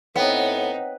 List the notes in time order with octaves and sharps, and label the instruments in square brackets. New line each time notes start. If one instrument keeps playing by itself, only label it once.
[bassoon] A2 [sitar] B3 [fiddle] C4 D#4 [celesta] C#5 G5